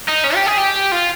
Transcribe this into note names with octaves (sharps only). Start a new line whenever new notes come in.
D#4
C#4
G4
G#4
G4
F4